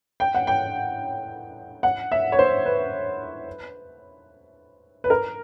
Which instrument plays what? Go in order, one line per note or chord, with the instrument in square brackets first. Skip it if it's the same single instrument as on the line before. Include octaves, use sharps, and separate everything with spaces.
[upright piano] G5
F#5
G5
F#5
E5
C#5
C5
B4
B4
A#4